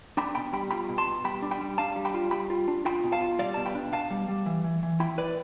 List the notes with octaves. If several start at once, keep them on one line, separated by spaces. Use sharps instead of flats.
D4 G5 B5
B2 G5 B5
G3 G5 B5
F4 G5 B5
B2
A5 C6
B2
G3 G5 B5
D4
G5 B5
G3
D4 F5 A5
G3
G5 B5
F4
G3 G5 B5
F4
D4
F4 G5 B5
B2
F5 A5
F4
G3 D5 F5
B2 A5
G5 B5
D4
B2 F5 A5
G3
G3
E3
E3
E3
E4 G5 B5
E4 B4 D5